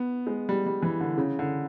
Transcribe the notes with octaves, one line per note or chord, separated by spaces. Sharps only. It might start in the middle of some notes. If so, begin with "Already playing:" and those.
Already playing: B3
G#3
G3
G3
E3
D3
C#3
D3